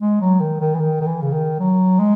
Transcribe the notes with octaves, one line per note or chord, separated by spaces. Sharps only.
G#3
F#3
D#3
D#3
E3
D#3
D#3
E3
C#3
D#3
F#3
G#3